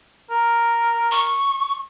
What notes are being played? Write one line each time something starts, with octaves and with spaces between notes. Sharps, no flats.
A#4
C#6